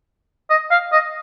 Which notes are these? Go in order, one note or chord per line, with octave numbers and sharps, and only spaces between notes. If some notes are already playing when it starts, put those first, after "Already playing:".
D#5
F5
D#5